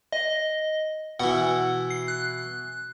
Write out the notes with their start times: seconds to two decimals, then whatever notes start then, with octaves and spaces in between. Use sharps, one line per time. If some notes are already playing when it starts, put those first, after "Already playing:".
0.12 D#5
1.20 B2 E3 F#5
1.91 C7
2.08 F#6